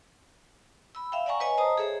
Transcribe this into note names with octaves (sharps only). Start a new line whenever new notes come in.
B5 E6
E5 F5 G5
D5 F5 F#5 G#5 A#5 C#6
B4 C#5 D#5 G#5
C5 D#5 A5 A#5 D#6
G#4 A4 C5 C#5 E5